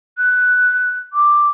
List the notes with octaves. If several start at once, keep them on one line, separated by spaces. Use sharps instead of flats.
F#6
D6